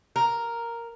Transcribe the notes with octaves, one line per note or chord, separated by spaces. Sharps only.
A#4